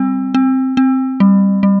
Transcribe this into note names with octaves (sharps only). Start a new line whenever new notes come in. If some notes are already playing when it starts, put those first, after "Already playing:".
Already playing: G3 C4
C4
C4
G3
G3